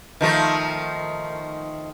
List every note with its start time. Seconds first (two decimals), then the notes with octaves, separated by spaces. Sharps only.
0.21 D#3 F3 A3